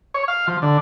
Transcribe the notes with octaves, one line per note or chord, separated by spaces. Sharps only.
C#5
F5
F3
D3